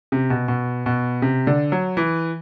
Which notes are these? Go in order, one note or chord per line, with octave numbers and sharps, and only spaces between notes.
C3
B2
B2
B2
C3
D3
F#3
E3